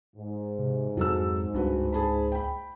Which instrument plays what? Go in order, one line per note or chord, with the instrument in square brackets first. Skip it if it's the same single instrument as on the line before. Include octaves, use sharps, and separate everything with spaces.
[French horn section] G#2
[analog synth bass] C3
[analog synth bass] F2 [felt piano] F#3 A4 E6
[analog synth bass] C#2 [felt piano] G2 F#4 B4
[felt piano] G#4 A5 B5
G5 B5